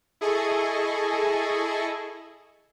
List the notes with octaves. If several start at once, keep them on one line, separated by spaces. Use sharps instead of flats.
E4 G#4 A4 D#5 G#5 C#6